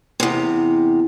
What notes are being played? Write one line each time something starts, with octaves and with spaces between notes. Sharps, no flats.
E2 C3